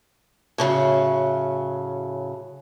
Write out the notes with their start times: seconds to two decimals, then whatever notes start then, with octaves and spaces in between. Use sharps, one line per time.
0.58 A2 C#3 F#3